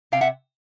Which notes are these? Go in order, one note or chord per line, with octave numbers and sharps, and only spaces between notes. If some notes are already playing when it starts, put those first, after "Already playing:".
C3 F5 G5
E5 F#5